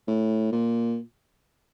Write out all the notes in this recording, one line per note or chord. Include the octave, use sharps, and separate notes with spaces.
A2
A#2